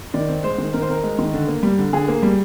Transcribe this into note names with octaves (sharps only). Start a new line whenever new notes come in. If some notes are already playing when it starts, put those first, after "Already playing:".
D#3 D5
C4
G#3 C5
D#3
D#3 A#4
C5
C4 A#4
G#3
D#3
D3
A#3
G3
D3
D3 G#4
A#3
G3